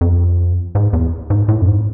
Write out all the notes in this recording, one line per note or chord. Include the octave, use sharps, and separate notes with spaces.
F2
G#2
E2
G#2
A2
F2
G#2